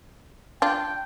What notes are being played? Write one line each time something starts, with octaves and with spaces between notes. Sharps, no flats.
D4 F4 G5